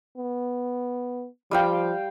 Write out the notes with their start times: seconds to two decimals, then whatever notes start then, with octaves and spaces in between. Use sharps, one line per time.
0.17 B3
1.51 F3 G3 F5 G5